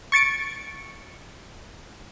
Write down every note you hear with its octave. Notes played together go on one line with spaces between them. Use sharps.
C#6 A6 C#7 D7